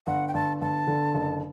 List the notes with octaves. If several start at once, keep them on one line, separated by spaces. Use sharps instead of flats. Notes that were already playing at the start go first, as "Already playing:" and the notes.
G1 F#5
G5
G1 A5
G1 A5
D3
F#1